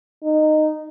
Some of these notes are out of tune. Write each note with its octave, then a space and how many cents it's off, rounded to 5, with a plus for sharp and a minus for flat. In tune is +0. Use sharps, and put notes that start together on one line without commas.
D#4 -15